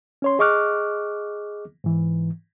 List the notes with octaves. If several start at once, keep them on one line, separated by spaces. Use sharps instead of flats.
C#4 C#5 C6
G#4 D#5 C#6 D6 F6 F#6
G#2 E3